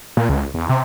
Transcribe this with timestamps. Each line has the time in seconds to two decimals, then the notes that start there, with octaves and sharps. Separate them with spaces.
0.17 A#2
0.29 C#2
0.54 E2
0.69 C3